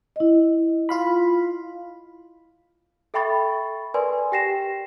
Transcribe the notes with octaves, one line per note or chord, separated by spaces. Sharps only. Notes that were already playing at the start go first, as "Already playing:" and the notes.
E4 D#5
F4 F5 B5
A4 E5 G5 B5 C#6 A6
A#4 B4 D5 G#5 C6
G4 G5 A#6 C7 E7